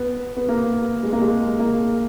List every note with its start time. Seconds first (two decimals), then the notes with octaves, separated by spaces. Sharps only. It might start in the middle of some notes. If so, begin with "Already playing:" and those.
Already playing: B3
0.37 B3
0.49 A#3
1.03 G#3
1.13 A#3
1.21 G#3
1.59 A#3